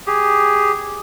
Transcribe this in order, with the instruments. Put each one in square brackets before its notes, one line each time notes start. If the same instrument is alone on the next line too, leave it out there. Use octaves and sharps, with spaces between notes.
[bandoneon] G4 G#4